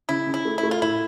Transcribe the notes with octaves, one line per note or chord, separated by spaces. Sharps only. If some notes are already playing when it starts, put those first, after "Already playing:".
C#3 E4
C#3
E4
A3
E4
A3
F4
A2 E4